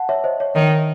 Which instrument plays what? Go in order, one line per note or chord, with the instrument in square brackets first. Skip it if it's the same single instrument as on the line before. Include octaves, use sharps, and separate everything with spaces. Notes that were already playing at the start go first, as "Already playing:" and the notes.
Already playing: [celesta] F#5 A5
C#5 E5
C5 D#5
C#5
[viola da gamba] D#3 [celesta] C#5